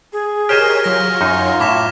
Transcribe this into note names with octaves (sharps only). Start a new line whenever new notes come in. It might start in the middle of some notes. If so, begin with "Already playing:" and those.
G#4
G4 A#4 C5 C#5 D#5 G#5 F6
F#3 F4 C#5 A#6
F#2 D#4 F4
A2 D6 G#6 B6 E7